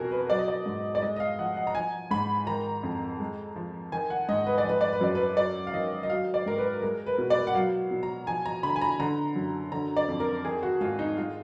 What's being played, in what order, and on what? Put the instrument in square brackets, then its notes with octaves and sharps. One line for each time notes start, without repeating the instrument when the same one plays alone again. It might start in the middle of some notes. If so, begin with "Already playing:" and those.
Already playing: [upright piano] F2 B2 F#4 G#4 A#4
B4
F#3 D5
D#5
D5
G#2
D5
G#3 D#5
D#5
F5
F3 F#5
F#5
A#5
F3 G#5
G#2 B5
D#3 A#5
F2
G#3
F3
D#3 G#5
F#5
G#2 D#5
B4
D5
F3 B4
D5
B4
F#2 D5
B4
F#3 D5
F5
D#3 D#5
D#5
F#3 F5
D5
G#2 A#4
B4
G#3 A#4
B4
B2
D5
F#5
F#3 F5
B2
A#5
F3 G#5
A#5
D3 B5
G#5
A#5
D3 A#5
F#2
D3 A#5
D5
F2
A#4
D#3 G#4
F#4
G#2 F4
D#4
G#3 F4